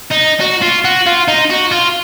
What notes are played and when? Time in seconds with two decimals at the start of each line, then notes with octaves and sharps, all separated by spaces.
0.11 D#4
0.41 F#4
0.62 F4
0.85 F#4
1.06 F4
1.28 D#4
1.50 F#4
1.72 F4